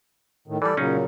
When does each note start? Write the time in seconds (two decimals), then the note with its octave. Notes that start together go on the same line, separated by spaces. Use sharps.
0.48 A2 D#3
0.62 E3 G3 A4 D5
0.77 A#2 C#3 F#3 C#4 D#4 G#4